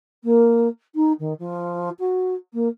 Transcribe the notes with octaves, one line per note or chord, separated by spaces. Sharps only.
A#3
D#4
D#3
F3
F#4
A#3